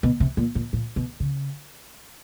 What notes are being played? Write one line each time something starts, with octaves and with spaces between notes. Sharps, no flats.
B2
C3
A#2
A#2
A#2
B2
C#3